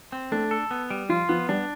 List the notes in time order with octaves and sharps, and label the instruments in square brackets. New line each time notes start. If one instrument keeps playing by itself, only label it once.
[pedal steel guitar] C4
[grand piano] A3 [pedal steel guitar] D4
[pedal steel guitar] A4
B3
G3
[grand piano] F3 [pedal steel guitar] F4
[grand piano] F3 [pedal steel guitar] B3
[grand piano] G3 [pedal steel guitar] D4